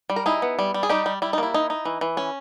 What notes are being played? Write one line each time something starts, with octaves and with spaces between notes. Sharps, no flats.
G3
A#4
D#4 E4 G#4
B3
G3
G3
G#4
G3 D#4 G4
G3
G3 E4
D#4
A#3 E4
D#4
D#4
E3
E3
C#4